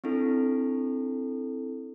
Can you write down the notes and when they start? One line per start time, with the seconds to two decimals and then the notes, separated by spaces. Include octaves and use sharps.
0.04 C4 D4 E4 A4